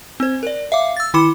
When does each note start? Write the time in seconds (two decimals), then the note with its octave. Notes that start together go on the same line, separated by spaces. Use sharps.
0.20 C4 C5
0.43 A#4 D5
0.72 E5 F5 D6
0.97 E6 A6
1.14 D#3 E4 B5 D6 C#7 E7